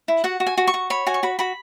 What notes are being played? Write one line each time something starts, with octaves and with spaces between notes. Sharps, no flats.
E4
F#4 F#5
F#4
G#5
F#4
C#6
F#4
C#5 B5
F#4 G#5
C#6
F#4 B5
F#4 B5